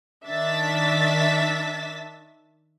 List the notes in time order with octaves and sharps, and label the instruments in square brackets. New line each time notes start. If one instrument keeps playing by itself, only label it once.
[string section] D#3 D4 E5 A6 B6